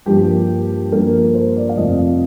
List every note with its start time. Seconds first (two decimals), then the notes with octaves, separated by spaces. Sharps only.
0.06 G2 F3 A#3 G4
0.91 G2 F3 A#3 A#4
1.34 C5
1.56 D5
1.69 F5
1.77 F2 C3 F3 A3 D#5